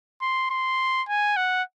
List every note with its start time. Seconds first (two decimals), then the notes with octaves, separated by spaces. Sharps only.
0.21 C6
0.50 C6
1.08 G#5
1.37 F#5